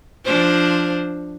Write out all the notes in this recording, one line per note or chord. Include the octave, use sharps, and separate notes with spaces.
F3 D4 C5